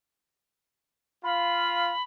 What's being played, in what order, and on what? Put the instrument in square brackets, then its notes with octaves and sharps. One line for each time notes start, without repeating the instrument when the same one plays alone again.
[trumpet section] F4 F5 [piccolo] B5